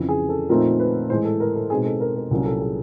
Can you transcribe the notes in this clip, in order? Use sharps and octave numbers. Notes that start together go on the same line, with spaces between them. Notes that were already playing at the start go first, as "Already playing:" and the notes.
Already playing: F2 C#3 E3
G#4
A4
A#2 F3 A3 C4 D#4 A#4
B4
A2 E3 G#3 C5
A4
A#4
A4
B2 G#3 C4 D#4 G#4
A4
A#4
A#4
C2 A#2 F#3 A#3 C#4
A4
G#4